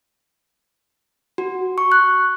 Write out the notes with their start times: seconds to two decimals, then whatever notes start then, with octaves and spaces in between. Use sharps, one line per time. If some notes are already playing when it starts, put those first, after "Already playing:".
1.38 F#4
1.78 C#6
1.92 F#6